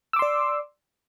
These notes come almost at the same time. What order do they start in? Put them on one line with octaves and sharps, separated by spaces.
E6 D6 C6 D5